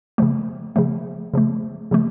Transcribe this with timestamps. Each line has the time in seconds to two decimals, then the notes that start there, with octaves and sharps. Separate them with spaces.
0.18 C#3 F3 A3
0.76 C#3 F3 A3
1.34 C#3 F3 A3
1.91 C#3 F3 A3